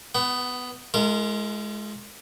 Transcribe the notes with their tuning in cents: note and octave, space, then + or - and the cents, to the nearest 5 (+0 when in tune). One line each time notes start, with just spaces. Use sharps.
B3 +10 F#5 +40
G#3 +20 F4 -35 A#4 -25